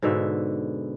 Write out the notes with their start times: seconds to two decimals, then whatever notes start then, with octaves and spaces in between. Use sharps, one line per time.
0.02 G#2 B2 D3 E5